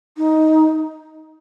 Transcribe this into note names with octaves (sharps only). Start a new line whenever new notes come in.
D#4